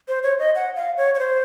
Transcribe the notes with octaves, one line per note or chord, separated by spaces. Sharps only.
C5
C#5
D#5
F#5
F5
C#5
C#5
C5